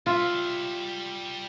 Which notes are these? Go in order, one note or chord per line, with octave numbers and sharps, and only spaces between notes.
G3 F4 E5